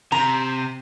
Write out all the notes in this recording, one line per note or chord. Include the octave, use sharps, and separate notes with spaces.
C3 A#5